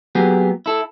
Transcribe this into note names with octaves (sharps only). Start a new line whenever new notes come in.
F#3 A#3 B3 G4 G#4
E4 A4